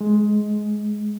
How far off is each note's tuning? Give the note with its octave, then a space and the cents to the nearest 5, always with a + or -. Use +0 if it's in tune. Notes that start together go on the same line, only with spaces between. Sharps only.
G#3 +15